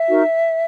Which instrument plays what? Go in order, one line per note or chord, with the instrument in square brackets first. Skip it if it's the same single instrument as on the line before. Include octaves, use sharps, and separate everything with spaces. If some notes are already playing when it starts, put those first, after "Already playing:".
Already playing: [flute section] E5
D#4 F#4 A#4